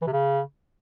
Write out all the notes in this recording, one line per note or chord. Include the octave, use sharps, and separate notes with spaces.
E3
C3
C#3